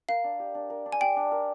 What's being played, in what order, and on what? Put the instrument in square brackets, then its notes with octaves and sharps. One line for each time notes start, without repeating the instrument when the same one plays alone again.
[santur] A#4 [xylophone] F5
[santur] D4
G4
D4
A#4
D4
[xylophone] G#5
[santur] G4 [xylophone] G5
[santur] D4
A#4